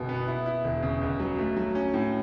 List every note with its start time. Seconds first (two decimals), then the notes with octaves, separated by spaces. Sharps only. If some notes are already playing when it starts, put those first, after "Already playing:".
Already playing: F#1 B2
0.09 B3
0.28 E4
0.46 E4
0.64 E1
0.83 C#3
1.01 C#2
1.20 F#3
1.38 A3
1.57 F#3
1.75 C#4
1.94 A2